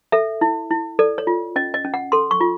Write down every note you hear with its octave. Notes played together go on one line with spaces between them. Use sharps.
A4 E5
E4
E4
A4 D5
C#5
F4
C#4 D#5
D#5
C#4
F#5
A4 C6
C#6
F4